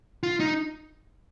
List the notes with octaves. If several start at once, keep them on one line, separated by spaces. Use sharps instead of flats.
F4
D#4